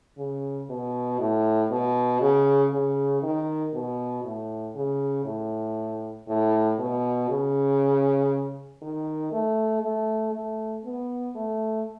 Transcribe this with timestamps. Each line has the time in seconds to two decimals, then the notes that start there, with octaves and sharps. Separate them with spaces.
0.18 C#3
0.69 B2
1.20 A2
1.71 B2
2.21 C#3
2.72 C#3
3.23 D#3
3.74 B2
4.24 A2
4.75 C#3
5.26 A2
6.28 A2
6.79 B2
7.29 C#3
8.82 D#3
9.32 A3
9.83 A3
10.34 A3
10.85 B3
11.35 A3